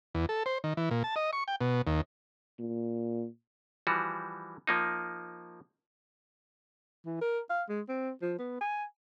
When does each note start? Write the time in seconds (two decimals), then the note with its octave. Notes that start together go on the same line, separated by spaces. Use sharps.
0.15 E2
0.29 A4
0.46 C5
0.64 D#3
0.77 E3
0.91 A#2
1.04 A5
1.16 D#5
1.33 C#6
1.48 G5
1.61 B2
1.87 D#2
2.59 A#2
3.87 E3 F3 G3 F#4
4.67 F3 A#3 D#4
7.06 E3
7.21 A#4
7.50 F5
7.69 G#3
7.88 C4
8.22 F3
8.39 B3
8.60 G#5